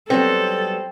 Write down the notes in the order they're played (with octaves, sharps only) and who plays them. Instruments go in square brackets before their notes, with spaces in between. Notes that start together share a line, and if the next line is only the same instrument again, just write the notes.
[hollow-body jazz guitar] F#3 G3 B3 [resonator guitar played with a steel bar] C4 [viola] A4